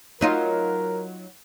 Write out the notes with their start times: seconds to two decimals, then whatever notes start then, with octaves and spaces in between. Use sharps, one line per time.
0.21 F#3 D#4 F4 A#4